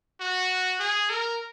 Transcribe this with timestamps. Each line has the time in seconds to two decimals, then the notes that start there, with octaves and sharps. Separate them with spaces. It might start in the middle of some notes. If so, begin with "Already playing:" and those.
0.20 F#4
0.79 G#4
1.09 A#4